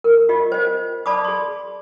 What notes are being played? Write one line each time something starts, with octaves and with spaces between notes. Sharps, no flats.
A#4
F4 G4 D#5
C5 D#5
D5 A5 B5 D6 D#6
G#4 C6